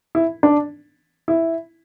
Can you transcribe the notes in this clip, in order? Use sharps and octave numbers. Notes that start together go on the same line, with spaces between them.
E4
D4
E4